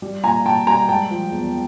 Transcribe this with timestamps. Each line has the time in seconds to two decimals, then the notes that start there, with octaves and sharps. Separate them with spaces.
0.02 G3
0.24 A#2 G#5 A#5
0.46 A#2 G5 A5
0.67 G3 G#5 A#5
0.89 G#3 G5 A5
1.11 F3
1.32 E2